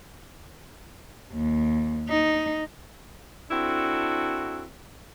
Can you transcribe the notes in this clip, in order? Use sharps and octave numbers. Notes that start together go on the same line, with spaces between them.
D#2
D#4
C4 D4 E4 F#4 A4